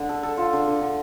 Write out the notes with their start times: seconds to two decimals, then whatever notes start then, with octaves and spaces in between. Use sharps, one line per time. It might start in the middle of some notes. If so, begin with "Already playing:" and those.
Already playing: D3
0.09 A4
0.23 A4
0.37 F4
0.53 D3
0.67 D3
0.81 D3